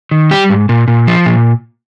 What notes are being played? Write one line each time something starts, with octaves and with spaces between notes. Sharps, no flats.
D#3
G3 G4
G#2
A#2
A#2
F3
A#2